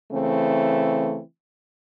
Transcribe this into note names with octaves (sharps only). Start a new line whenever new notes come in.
C#3 E3 A3 C4